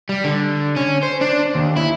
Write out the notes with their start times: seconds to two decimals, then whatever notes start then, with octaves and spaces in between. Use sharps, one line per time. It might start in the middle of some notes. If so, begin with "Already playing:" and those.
0.09 G3
0.24 D3
0.76 C#4
1.03 C5
1.21 D4
1.55 D#2
1.77 E4